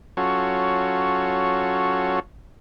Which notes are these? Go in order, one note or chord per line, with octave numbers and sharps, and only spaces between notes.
F#3 C#4 F4 F#4 A4 C#5